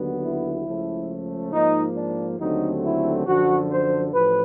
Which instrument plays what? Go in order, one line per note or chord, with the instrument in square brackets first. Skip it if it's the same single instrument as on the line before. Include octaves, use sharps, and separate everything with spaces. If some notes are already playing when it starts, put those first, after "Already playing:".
Already playing: [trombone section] D#2 D3 F#3 B3
E4
C#2 C#3 F3 A3
G#2 F3 A#3 D#4
D4
D#2 D3 F#3 A3 C4 D#4
E4
F#2 D3 F3 F#4
C5
A1 A2 F3 B4